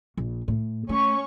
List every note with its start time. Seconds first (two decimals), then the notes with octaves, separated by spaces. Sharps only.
0.17 A#1
0.48 A2
0.89 A3 C#4 C#6